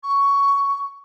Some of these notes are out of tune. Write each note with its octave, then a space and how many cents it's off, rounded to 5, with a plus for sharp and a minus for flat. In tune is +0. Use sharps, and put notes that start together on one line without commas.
C#6 +10